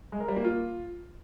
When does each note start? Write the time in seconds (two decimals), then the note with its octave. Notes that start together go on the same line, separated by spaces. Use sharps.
0.12 G#3
0.20 A#4
0.28 G3
0.37 A#3
0.45 F4